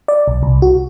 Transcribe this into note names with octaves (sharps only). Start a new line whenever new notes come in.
D5
B1
C2
F#4